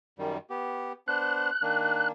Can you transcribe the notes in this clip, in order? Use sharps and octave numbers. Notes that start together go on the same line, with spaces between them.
F#2 D#3 G3
B3 G4
B3 D4 C5 F#6
D#3 A#3 D4